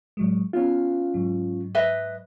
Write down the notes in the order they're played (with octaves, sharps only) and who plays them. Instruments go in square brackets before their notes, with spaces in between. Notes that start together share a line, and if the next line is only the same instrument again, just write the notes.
[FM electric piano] A2 F#3 G#3
[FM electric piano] B3 F5 [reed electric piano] C#4 F4
[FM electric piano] G#2 F#3
[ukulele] B4 D#5 E5